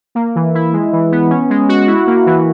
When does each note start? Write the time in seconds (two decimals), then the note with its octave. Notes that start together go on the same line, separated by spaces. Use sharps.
0.15 A#3
0.35 E3
0.55 E4
0.73 G#3
0.93 E3
1.12 B3
1.30 C#4
1.50 G#3
1.69 F#4
1.87 E4
2.07 A#3
2.26 E3